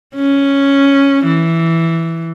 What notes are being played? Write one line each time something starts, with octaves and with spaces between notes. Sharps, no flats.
C#4
E3